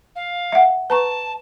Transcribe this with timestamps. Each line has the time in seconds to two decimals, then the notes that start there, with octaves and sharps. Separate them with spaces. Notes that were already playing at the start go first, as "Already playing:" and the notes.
0.16 F5
0.52 E5 F#5
0.90 B4 A5 A#5 C#6